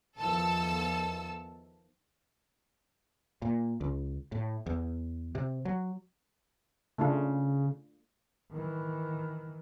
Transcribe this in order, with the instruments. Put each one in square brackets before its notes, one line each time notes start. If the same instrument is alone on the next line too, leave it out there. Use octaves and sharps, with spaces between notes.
[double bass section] E2 D#3 F3 [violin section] A4 A5 E6
[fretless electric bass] A#2
C#2
A2
E2
C3
F#3
[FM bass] C#3 [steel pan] A3 D4 F4
[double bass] D#3 E3